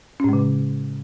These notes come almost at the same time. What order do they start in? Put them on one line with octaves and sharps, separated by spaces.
C#4 A2 G#3 C#3